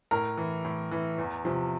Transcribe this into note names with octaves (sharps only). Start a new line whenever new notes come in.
A2 A#4
E3
A2
E3
E2
C3 F3